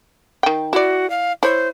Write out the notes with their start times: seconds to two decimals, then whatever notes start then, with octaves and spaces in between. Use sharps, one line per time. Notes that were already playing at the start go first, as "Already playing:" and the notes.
0.43 D#3 G5
0.73 E4 F#4 D5
1.10 F5
1.43 E4 C5 C#5